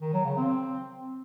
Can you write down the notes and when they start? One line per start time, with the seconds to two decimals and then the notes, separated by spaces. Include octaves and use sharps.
0.01 D#3
0.13 F#3
0.25 C#3
0.37 C4